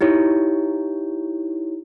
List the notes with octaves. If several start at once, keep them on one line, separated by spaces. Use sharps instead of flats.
D#4 E4 G4 C#5